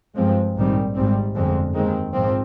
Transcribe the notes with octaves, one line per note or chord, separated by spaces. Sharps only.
G2 F3 G#3 C4
A#1 G#2 D#3 G3 C4
G#1 G#2 G3 C4
G1 F2 D3 G#3 C4
D#2 D#3 G#3 C4
A#1 G#2 F3 C4